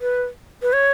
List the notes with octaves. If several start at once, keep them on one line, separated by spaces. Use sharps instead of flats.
B4
B4
C#5